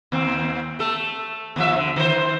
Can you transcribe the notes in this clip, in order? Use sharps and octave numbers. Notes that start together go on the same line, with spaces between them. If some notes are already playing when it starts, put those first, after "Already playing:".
D#2 C4
A3 A4
D#2 F3 E5
D3
D#3 C5